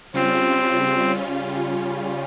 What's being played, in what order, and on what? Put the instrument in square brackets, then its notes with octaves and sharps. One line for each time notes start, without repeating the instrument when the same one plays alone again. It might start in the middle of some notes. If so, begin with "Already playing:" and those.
[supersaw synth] C#3 G3 C#4 F4 [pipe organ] C4